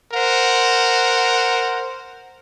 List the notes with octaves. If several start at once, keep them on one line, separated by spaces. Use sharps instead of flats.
A#4 C5 F#5